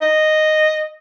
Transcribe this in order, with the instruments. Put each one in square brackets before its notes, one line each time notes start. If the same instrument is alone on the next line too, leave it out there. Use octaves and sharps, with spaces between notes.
[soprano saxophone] D#5